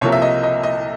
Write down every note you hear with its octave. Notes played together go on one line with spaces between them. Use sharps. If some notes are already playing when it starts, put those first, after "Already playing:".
C2 C3 F3 A#3 C#5
E5
D#5
D#5
D#5